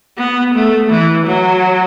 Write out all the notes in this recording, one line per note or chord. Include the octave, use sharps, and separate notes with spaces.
B3
A3
E3
F#3